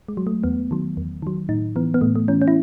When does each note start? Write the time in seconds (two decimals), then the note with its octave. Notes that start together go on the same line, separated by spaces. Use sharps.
0.08 G#3
0.17 F#3
0.27 A3
0.44 E2 B3
0.71 D#3 F#3
0.97 E2
1.22 D#3 F#3
1.49 A2 D#4
1.76 E3 B3
1.94 B3
2.01 A2 A3
2.16 A3
2.28 E3 C#4
2.42 C#4
2.48 E4